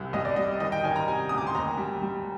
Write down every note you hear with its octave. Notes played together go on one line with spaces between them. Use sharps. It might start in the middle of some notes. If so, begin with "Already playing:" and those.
Already playing: C2 C3
C2 D#5
D5
G3 D#5
D#3 D#5
G5
D#3 G#5
A#5
C3 G#5
D2 D#6
D6
C6
D#2 A#5
G3
G3